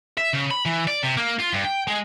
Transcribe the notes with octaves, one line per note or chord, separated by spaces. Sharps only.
E5
C#3
B5
E3
D5
C3
A#3
F4
G2
G5
G#3